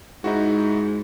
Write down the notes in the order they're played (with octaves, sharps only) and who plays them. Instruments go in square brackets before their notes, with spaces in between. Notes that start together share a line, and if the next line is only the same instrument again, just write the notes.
[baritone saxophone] G#2 [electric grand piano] D#4 E4 F#4